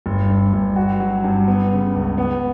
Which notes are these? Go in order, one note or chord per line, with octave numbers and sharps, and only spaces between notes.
G1
G2
G1
F#4
F#3
G2
B3
C#3
C#2
B3